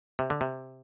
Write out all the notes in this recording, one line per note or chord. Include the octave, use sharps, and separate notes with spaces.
C3
D3
C3